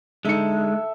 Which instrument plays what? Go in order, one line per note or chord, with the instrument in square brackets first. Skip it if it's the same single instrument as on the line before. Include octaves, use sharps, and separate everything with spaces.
[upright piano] D3 D#4 C#7 [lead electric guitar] G#3 [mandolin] A4 E5